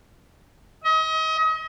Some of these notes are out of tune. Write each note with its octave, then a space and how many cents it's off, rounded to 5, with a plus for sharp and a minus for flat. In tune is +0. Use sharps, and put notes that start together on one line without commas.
D#5 +35